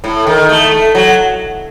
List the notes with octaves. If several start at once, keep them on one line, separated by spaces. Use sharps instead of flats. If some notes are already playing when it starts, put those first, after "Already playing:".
A2
D#3
A3
A3
F#3